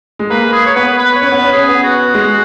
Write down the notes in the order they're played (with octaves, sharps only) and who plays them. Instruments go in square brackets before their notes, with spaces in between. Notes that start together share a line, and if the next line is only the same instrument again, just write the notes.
[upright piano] G#3
[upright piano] A#3 [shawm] B4
[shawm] G#4
C#5
[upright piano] B3 [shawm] B4
[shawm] B4
C#5
[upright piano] C#4 [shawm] B4
[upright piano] B3
C#4
[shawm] G#4
[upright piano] B3
[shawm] F#4
[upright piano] G#3